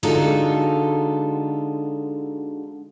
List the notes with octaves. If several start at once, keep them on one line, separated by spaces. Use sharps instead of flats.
D3 G#3 D#4 F4 F#4 A4